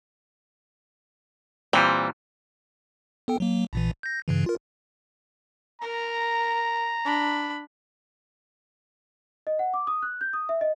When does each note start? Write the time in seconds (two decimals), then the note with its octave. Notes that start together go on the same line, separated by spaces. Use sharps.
1.73 A#2 E3 G3 C4
3.28 B3 A4 G5
3.40 F#3 A#3
3.73 A#1 A#2 E3
4.03 G6 A#6
4.28 G2 C#3 E3
4.46 F4 A#4
5.82 A#4 A#5
7.05 D4 B5
9.47 D#5
9.59 F#5
9.74 D6
9.87 D#6
10.02 F#6
10.21 G6
10.33 D#6
10.49 E5
10.61 D#5